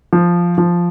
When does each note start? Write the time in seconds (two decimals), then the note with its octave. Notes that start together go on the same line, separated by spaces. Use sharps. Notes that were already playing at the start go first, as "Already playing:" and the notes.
0.13 F3
0.58 F3